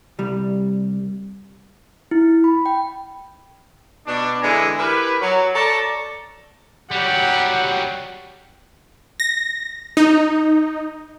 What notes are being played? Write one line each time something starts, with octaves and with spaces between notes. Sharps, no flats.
C2 G3
E4
B5
G5
B2 D4
D3 E3 G#3 E4 G#5 A#5
E4 G4 A#4 B4
F#3
A4 C#5 D5 A5 A#5
F#3 G3 G4 F#5
A#6
D#4